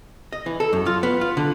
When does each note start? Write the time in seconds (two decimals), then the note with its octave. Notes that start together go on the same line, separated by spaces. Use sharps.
0.33 D#5
0.46 E3
0.60 A4
0.73 F#2
0.86 F4
1.03 B3
1.21 F4
1.37 D3